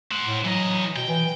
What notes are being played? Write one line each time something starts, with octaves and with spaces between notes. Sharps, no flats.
C5 F#5
A2
E3 F#3 D#5
B2 G5
E3